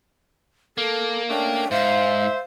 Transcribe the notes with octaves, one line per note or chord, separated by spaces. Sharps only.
A#3 A4
A3 C#4 D4 G5
G#2 C5 E5 F5